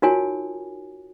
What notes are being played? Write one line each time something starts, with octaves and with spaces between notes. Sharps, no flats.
D#4 F4 F#4 A#4 C#5 G#5